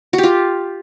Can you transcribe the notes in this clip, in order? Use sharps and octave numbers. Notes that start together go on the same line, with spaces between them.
F#4
G4
F4